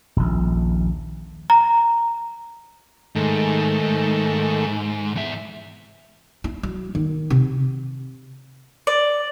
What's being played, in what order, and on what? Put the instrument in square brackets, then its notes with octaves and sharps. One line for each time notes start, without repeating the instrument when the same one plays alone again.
[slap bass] D#1 A#1
[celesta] A#5
[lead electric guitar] G#2 [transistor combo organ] D#3 A3
[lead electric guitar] E2 E5
[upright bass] E4
F#3
D#3
C3
[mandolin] D5